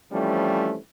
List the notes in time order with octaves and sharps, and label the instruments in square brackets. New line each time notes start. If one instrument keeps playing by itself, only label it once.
[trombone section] E3 F3 G3 A3 C4 C#4